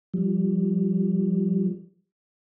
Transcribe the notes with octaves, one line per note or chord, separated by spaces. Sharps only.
F3 G3